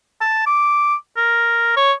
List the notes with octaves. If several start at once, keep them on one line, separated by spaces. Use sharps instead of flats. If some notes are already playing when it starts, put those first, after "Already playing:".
A5
D6
A#4
C#5